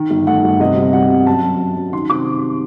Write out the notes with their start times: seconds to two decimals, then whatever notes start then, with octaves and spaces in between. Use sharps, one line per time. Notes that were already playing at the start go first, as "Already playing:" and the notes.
Already playing: D#3
0.10 G1
0.27 A3 F#5
0.44 G1
0.60 C3 D#5
0.77 C2
0.93 G3 F#5
1.10 C2
1.27 F#2 A5
1.43 F#2
1.60 F#2
1.76 F#2
1.93 D#3 C6
2.10 C3 D6